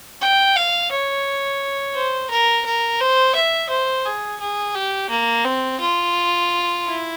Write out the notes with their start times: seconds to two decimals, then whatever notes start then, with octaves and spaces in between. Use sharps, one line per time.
0.21 G5
0.56 F5
0.91 C#5
1.95 C5
2.30 A#4
2.66 A#4
3.00 C5
3.35 E5
3.69 C5
4.05 G#4
4.40 G#4
4.75 G4
5.10 A#3
5.45 C4
5.80 F4
6.85 E4